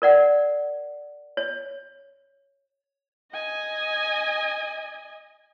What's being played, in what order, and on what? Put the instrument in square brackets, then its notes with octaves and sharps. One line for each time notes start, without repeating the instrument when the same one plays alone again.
[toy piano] A#4 D5 F#5
C#5
[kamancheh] D#5 G#5